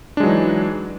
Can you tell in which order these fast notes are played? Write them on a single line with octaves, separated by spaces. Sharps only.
D4 G#3 F#3 E3 D#4